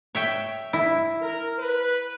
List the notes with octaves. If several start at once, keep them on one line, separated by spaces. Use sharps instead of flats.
C#5 E5 G5
E4
A#4
B4